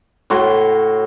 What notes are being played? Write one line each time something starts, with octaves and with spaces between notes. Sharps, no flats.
A2 F#4 C6